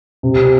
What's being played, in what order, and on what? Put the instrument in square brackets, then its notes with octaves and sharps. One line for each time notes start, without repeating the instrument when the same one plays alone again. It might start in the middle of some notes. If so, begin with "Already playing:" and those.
[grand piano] C3